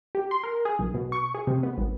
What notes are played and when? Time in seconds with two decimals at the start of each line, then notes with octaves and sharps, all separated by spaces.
0.15 G4
0.31 C6
0.44 A#4
0.65 G#4
0.79 B1
0.94 B2
1.12 C#6
1.35 G#4
1.47 C3
1.63 B3
1.78 G#1